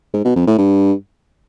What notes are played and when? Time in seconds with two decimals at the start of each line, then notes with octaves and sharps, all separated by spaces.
0.14 G#2
0.25 B2
0.36 F2
0.47 A2
0.58 G2